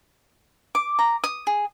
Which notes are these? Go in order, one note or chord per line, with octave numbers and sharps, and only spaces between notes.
D6
A#5
D#6
G#4